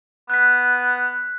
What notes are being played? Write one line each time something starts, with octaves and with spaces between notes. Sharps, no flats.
B3 F#6 B6